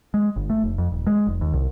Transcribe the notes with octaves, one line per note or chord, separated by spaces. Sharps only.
G#3
G1
A3
F1
F2
D#1
G#3
F1
D#2
C2